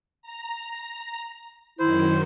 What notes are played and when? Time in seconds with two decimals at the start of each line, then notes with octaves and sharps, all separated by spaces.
0.22 A#5
1.79 F#2 D#3 E4 C5